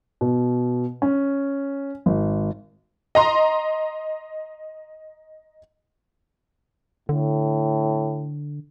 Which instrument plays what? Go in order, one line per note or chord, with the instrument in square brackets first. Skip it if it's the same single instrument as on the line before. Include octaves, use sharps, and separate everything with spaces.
[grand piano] B2
C#4
G#1
[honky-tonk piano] D#5 A#5 C6
[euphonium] A2 [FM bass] D3